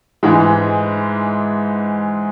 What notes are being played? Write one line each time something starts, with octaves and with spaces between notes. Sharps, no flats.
G#2 E3 G#3